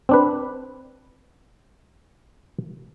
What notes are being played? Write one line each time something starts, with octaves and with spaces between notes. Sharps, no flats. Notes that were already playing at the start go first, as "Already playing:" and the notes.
C4 D4 B4